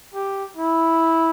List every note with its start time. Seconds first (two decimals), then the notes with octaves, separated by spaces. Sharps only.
0.14 G4
0.57 E4